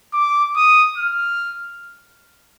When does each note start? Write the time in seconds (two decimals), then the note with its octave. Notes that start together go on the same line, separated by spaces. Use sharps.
0.14 D6
0.56 D#6
0.98 F6